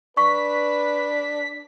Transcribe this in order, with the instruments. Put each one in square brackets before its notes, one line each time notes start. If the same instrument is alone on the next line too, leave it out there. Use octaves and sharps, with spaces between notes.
[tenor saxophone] D4 [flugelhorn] B4 [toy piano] C#6 [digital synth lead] B6